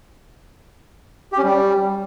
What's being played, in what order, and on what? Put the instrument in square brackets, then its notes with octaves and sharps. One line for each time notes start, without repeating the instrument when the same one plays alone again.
[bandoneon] G4
C#4
G3